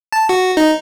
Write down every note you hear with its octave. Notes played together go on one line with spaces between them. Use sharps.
A5
F#4
D#4